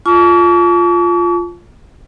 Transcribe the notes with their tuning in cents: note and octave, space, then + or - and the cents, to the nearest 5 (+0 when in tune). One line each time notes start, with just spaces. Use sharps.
F4 +0 A5 -30 C#6 +45